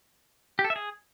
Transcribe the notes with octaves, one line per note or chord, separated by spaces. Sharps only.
G4
A4
E5
G#4